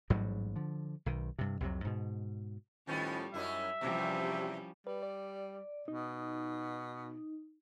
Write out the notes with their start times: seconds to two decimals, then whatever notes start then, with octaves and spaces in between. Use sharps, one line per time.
0.10 A1 G#2 F#3 G3
0.56 D3 F3
1.06 B1 D#3
1.39 G2 C3
1.60 C2 F2 C3 F#3
1.85 G#2 B2
2.87 A2 D#3 F3 G3 B3 C#4
3.34 F#2 C#4 D#4 E4 E5
3.81 E2 C3 F3 G3 C#4
4.87 G3 B4
5.03 D5
5.88 B2 D#4